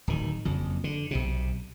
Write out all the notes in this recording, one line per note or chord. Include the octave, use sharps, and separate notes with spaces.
D1 D#3
F#1 F2
D3
B1 C3